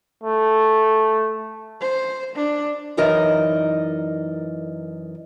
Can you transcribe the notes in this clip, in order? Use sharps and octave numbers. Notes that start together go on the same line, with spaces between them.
A3
C5
D4
F#2 E3 D#4 A#4 D5 D#5